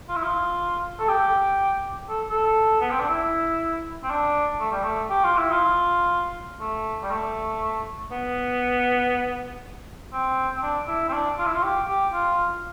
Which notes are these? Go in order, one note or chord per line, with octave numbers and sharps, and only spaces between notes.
F4
E4
F4
A4
G4
A4
A4
B3
C4
D4
E4
C4
D4
A3
G3
A3
G4
F4
E4
F4
A3
G3
A3
B3
C4
C4
D4
E4
C4
D4
F4
E4
F4
G4
G4
F4